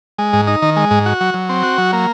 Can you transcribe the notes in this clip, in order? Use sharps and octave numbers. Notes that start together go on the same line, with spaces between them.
G#3
G#2
D#4
D#3
G#3
G#2
F#4
F#3
F#3
C4
F#4
F#3
A#3